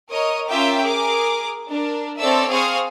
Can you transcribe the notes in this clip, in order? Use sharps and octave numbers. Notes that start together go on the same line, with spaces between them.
A#4 C#5 D#5 D#6
C#4 F4 A#4 E5 G5 D6
G#4 A#4 D6
D4 A#4
C4 A4 C#5 D5 E5 E6
C4 G#4 F5 C#6 D#6 F6